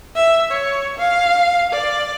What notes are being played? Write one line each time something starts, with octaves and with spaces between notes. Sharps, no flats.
E5
C#5
F5
D5